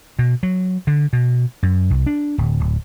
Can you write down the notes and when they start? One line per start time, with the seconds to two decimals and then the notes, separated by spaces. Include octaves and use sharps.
0.19 B2
0.43 F#3
0.87 D3
1.13 B2
1.63 F#2
1.90 C2
2.06 D4
2.38 D1
2.60 D1